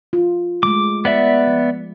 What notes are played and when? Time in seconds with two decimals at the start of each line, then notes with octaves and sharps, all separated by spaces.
0.13 F4
0.63 G#3 A3 D6
1.05 B3 D5 E5
1.47 F3